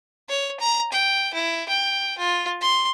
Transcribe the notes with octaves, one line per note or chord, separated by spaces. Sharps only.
C#5
A#5
G5
E4
G5
F4
C6